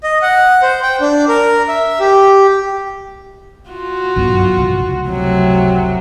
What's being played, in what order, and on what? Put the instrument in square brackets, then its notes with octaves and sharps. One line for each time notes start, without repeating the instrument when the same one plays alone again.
[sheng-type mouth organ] D#5
F#5
C5
G5
D4
A#4
E5
G4
[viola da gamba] F4 F#4
[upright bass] G1 F#2
F1 C#2
[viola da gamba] A2 C3 F#3